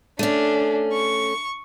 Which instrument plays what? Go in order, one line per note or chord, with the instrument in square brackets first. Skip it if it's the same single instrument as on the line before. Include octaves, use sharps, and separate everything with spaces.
[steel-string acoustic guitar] A3 C#4 [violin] D4
[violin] C#6